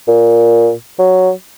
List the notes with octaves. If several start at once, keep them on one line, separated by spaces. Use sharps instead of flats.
A#2
F#3